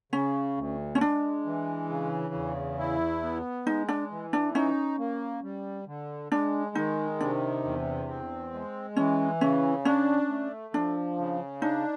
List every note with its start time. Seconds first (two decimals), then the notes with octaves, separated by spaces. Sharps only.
0.12 C#3 C#4
0.57 D2
0.95 C#4
1.01 G#3 D4
1.46 E3
1.89 C#3
2.34 E2
2.79 E4
3.23 B3
3.66 G#3 D#4
3.89 D4
4.11 E3
4.33 D4
4.55 C#4 D#4
4.99 A#3
5.43 G3
5.87 D3
6.32 G#3 D4
6.75 D#3 D#4
7.21 C3 D4
7.64 E2
8.08 C4
8.53 G#3
8.96 E3 C#4
9.41 C#3 C#4
9.85 C#4 D4
10.29 A3
10.74 F3 D4
11.18 C#3
11.62 D4 D#4